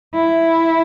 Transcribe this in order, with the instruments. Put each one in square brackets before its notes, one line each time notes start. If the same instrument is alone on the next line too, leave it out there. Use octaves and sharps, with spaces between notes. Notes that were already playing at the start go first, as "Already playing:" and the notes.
[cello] E4